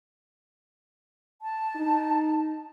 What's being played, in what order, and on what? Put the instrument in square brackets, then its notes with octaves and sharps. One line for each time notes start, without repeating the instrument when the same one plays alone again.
[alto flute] A5
[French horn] D#4